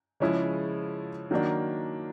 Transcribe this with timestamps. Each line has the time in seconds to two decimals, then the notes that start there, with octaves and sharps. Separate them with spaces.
0.20 C#3 F3 G#3 C#4 E4
1.31 D#3 F#3 A#3 D4